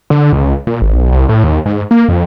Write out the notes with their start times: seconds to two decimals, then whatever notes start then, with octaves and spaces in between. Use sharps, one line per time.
0.10 D3
0.33 C#2
0.67 A#2
0.82 G#1
0.94 B1
1.12 C2
1.29 A2
1.44 D#2
1.66 G#2
1.91 A#3
2.08 F2